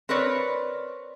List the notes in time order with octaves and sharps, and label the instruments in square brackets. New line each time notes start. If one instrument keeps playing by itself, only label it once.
[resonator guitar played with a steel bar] C4 A#4 B4 C#5 D5